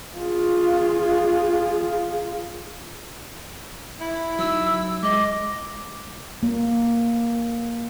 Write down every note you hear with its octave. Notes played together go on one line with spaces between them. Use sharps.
F4 G#4
E4
F#3 D#4 E6
G#3 D#5 D6
A#3